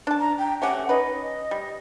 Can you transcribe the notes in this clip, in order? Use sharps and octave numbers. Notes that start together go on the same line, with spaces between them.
D4 A5
A#5
G5
A3 C#4 G4 F#5
C#4 D#4 B4 D#5
G3